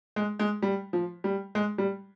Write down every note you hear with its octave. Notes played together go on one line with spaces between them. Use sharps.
G#3
G#3
G3
F3
G3
G#3
G3